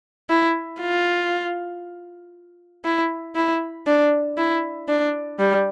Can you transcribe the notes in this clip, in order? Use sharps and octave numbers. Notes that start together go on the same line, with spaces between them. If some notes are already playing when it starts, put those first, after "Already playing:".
E4
F4
E4
E4
D4
E4
D4
G3